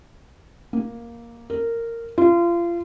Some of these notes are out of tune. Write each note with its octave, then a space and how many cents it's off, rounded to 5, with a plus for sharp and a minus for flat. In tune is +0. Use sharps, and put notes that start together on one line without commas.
A#3 +5
A#4 -15
F4 -30